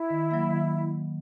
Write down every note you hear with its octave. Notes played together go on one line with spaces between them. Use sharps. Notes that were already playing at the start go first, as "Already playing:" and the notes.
Already playing: E4
D#3
F#3 A#3
D#3